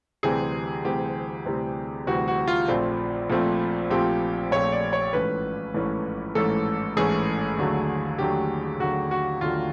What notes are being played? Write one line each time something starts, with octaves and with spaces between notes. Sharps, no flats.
D2 C3 E3 G3 C4 G#4
D2 C3 E3 G3 C4 G4
D2 C3 E3 G3 C4
D2 C3 E3 G3 C4 F#4
F#4
F4
A#1 A#2 F3 A3 C4
A#1 A#2 F3 A3 C4
A#1 A#2 F3 A3 C4 G4
A#1 A#2 F3 A3 C4 C#5
D5
C#5
A1 G#2 E3 A3 C#4 B4
A1 G#2 E3 A3 C#4
A1 G#2 E3 A3 C#4 A4
A1 G#2 E3 A3 C#4 G#4
D#2 D3 F#3 A3
D#2 D3 F#3 A3 G4
D#2 D3 F#3 A3 F#4
F#4
D#2 D3 F#3 A3 F4